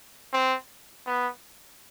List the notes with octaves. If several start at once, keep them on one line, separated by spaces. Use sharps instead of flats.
C4
B3